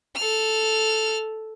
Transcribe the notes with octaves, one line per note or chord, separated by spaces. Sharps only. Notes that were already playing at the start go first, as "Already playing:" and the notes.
A4 F6